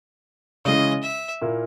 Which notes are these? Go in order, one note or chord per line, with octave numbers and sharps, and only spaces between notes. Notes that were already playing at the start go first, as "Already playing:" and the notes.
C#3 E3 G#3 C#4 G#4 D#5
E5
A#2 A#3 E4 A#4